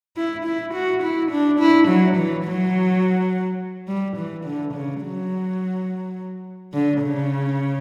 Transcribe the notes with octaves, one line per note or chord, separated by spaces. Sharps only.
E4
E4
F#4
E4
D4
E4
F#3
E3
F#3
G3
E3
D3
C#3
F#3
D3
C#3